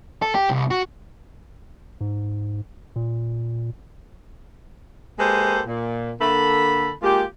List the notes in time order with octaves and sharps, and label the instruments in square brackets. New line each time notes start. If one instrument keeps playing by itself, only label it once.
[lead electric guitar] A4
G4
C2
F#4
[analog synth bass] G#2
A#2
[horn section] G#3 A#3 G4 A4 B4 C5
A#2
D3 A#3 A4 B5
G#3 A#3 F4 G4